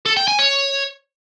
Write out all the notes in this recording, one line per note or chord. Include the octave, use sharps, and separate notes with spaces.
A4
G5
G#5
C#5